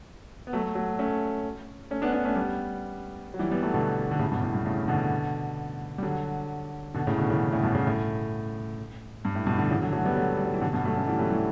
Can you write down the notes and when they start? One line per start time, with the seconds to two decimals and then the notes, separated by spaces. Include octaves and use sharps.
0.47 B3
0.53 F#3 A3
0.75 F#3 A3
0.99 A3 C#4
1.91 A3 C#4
2.02 B3 D4
2.08 C#4
2.13 B3 D4
2.25 A3 C#4
2.36 G3 B3
3.34 F#3
3.39 E3 G3
3.51 G3 B3
3.62 F#3 A3
3.74 B2 D3
4.11 D3
4.19 A2 C#3
4.31 G2 B2
4.43 A2
4.54 G2 B2
4.66 A2 C#3
4.88 B2 D3
5.98 G3
6.03 D3 F#3
6.94 B2 D3
7.07 A2 C#3
7.18 B2 D3
7.29 C#3 E3
7.52 A2 C#3
7.63 G2 B2
7.75 A2 C#3
7.87 A2
9.25 G2
9.35 A2
9.47 G2 B2
9.59 B2 D3
9.70 C#3 E3
9.82 D3 F#3
9.92 F#3 A3
10.05 G3 B3
10.15 F#3 A3
10.37 G3
10.45 F#3
10.54 E3
10.61 B2 D3
10.73 G2 B2
10.85 F#3 A3
10.96 A3 C#4
11.07 E3 G3
11.19 F#3 A3
11.30 E3 G3